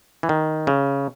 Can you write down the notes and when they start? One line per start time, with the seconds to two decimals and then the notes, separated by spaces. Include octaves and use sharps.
0.23 E3
0.29 D#3
0.67 C#3